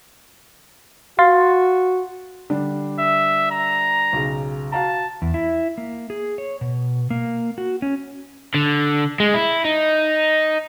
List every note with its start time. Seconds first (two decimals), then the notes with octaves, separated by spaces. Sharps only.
1.19 F#4 F5 C6 A6
2.50 D3 G3 D4
2.99 E5
3.51 A#5
4.13 B1 C#3
4.72 F#4 F5 A5 A#5
5.22 E2
5.34 E4
5.78 A#3
6.10 G#4
6.38 C#5
6.61 B2
7.10 A#3
7.58 F#4
7.82 C#4
8.54 D3
9.20 G#3
9.34 E4
9.65 D#4